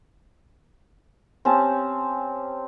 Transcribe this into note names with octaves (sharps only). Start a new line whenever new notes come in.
C4 C#4 G4 A5